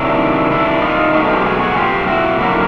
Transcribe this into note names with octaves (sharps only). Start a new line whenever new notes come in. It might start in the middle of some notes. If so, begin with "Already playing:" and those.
Already playing: C3 D#3 F#3 D4 E4
D4 E4
D#4 F4
B2 F#3 A3 D4 D#4 F4
G#4
F4 G4
F#4 G#4
F#4 G#4
F4 G4
E4 F#4
D3 F#3 A#3 C#4 E4 F#4